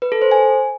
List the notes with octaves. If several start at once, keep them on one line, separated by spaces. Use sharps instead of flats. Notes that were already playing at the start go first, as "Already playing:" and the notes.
B4
A4
C5
G#5